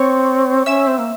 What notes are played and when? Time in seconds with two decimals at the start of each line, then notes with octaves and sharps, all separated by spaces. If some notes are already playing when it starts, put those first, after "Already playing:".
Already playing: C4 C#5 C#6
0.66 C#4 E5 E6
0.87 C4
0.98 A#3